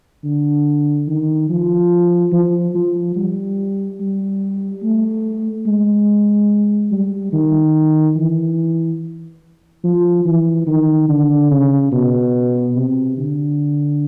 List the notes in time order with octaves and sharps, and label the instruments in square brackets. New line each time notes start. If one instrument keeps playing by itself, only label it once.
[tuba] D3
D#3
F3
F3
F3
G3
G3
A3
G#3
G3
D#3
E3
F3
E3
D#3
D3
C#3
B2
C3
D3